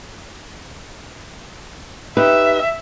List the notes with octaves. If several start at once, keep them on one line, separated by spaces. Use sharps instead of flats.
D#4 G4 B4 E5